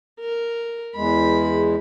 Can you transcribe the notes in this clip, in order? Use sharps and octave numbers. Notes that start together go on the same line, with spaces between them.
A#4
E2 G#3 B5